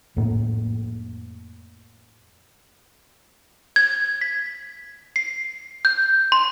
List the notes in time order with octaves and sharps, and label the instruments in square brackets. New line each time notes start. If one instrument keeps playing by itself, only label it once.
[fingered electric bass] F2 A2 A#3
[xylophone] G#6
B6
C7
G6
C6